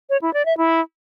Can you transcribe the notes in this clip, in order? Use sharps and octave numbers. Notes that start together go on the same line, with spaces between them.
C#5
E4
D5
E5
E4